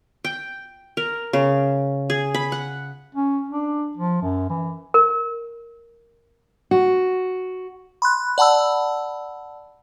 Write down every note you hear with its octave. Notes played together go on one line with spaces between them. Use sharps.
G5
A#4
C#3
G#4
B5
F#5
C#4
D4
F3
F#2
E3
A#4
F#4
B5 C6 F#6
D5 F#5 A5 B5 E6